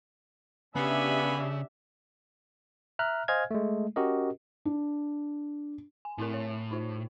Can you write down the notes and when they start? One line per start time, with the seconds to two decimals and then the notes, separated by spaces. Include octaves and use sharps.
0.76 C#3 B3 D4 G4 E5 G#5 B5
2.99 E5 A#5 F6 F#6
3.28 C5 D#5 F5 G#5 F6 G#6
3.51 G#3 A3
3.96 C#4 F#4 G4 A#4 D#5
4.65 D4
6.05 G#5
6.18 A2 C4 E4 A#4
6.34 C#5
6.71 D#4 F4 C5